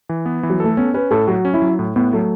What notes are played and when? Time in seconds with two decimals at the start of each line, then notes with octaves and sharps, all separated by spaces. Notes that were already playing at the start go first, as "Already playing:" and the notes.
0.09 E3
0.26 B3
0.43 E3
0.50 F#3
0.60 A3 A4
0.77 B3 C#4
0.94 C#4 B4
1.11 A2 A4
1.27 F#3 F#4
1.45 C#4
1.54 E4
1.62 F#3
1.79 A2
1.96 A2 B3
2.13 F#3 A3